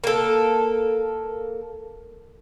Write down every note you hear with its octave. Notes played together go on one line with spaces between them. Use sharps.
A#3 A4